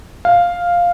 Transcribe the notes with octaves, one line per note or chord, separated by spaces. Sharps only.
F5